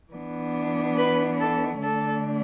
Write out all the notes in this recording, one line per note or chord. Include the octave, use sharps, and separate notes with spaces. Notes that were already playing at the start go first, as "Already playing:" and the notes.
E3 B3 D4
B4
A4
D3 A3 D4 A4